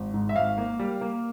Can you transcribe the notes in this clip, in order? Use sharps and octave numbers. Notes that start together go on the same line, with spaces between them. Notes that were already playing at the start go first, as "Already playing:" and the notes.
Already playing: G#1
G#2
E5
G#1 F5
A#3
G3
A#3